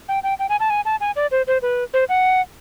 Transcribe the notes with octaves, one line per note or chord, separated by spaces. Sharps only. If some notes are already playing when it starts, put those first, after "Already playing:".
G5
G5
G5
G#5
A5
G#5
A5
G#5
D5
C5
C5
B4
C5
F#5